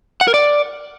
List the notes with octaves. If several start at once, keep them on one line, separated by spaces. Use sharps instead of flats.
F#5
A#4
D5